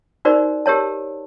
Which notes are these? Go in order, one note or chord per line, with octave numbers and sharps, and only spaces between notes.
D#4 F#4 A#4 C5 D5
G4 A#4 C#5 A5